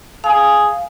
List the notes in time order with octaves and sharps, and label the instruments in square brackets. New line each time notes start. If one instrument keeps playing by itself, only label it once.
[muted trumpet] G#4 [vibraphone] F5